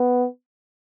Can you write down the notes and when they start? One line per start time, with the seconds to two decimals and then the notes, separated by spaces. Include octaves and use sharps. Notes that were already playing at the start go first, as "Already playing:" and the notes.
Already playing: B3